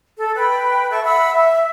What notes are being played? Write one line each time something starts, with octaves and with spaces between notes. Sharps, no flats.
A4
B4 G5 B5
A4 E5 C#6
E5 F#5 B5 E6
E5